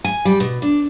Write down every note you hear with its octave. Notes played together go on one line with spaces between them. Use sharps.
G#5
G3
B2
D4